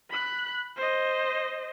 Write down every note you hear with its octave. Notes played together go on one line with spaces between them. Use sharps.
B5 F#6
C5 D#5